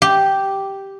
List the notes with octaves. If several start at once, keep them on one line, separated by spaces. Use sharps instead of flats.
G4